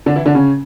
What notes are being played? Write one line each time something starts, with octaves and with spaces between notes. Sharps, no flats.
D3 D4
E3 E4
D3 D4
C#3 C#4